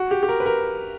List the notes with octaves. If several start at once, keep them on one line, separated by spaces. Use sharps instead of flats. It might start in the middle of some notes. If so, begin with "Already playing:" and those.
Already playing: F#4
G4
G4
A#4
B4
A#4